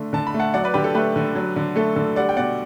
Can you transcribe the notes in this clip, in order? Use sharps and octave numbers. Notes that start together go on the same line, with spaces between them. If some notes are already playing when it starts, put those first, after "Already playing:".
Already playing: D3 A3
D3 A5
B5
A3
F#5 A5
F#3 D5 F#5
B4 D5
D3 G4 B4
A4
A3 G4 B4
D3
F#3
D3
A3 A4
D3 A4
G3 D5 F#5
G5
B2 D5 F#5